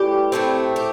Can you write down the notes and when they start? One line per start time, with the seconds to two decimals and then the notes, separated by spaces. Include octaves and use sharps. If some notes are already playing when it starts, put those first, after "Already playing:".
Already playing: A2 E3 G3 G4
0.32 A2 F3 A3 C4
0.76 G4